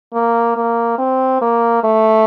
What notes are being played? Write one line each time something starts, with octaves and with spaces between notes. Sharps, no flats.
A#3
A#3
C4
A#3
A3